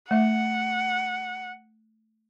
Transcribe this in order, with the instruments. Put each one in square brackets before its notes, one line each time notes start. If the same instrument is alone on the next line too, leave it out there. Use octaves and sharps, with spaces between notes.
[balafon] A3 E5 [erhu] F#5